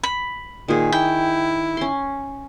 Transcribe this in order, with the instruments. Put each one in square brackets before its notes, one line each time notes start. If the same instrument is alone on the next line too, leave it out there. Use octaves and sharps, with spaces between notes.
[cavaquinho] B5
[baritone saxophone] A#2 [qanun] D#3 G#4
[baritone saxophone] E4 [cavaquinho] G5
[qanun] C#4 C6